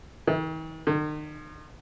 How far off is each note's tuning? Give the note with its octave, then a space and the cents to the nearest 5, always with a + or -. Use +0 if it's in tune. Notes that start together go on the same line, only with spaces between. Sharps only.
D#3 +45
D#3 -40